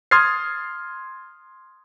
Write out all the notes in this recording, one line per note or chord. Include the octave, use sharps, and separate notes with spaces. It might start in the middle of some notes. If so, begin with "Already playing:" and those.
C6 D#6 F6 G#6 A6 C7